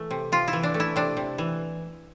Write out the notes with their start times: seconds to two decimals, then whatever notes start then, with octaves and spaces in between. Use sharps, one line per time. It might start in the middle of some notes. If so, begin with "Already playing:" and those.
Already playing: E3 A3
0.11 C3
0.32 C3 F4
0.48 E4
0.53 E3
0.63 D4
0.74 A3
0.80 E4
0.96 C3 D4
1.17 C3
1.38 E3